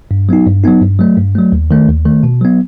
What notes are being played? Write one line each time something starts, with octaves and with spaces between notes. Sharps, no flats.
G2
F#3 B3 D#4
G2
F#3 B3 D#4
G2
F#3 A3
G2
F#3 A3
D#2
D#3 A3
D#2
D#3 A3
B2
F#3 B3